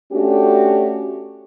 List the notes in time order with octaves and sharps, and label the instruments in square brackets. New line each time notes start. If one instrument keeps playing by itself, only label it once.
[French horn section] A3 C#4 D4 F#4 G4